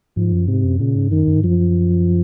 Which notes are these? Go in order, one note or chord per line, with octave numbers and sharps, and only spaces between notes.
G#2 F3
F#2
G#2 C3
F#2
A#2 C#3
G#2
F#2 D#3
F#2
G#2
F#2 F3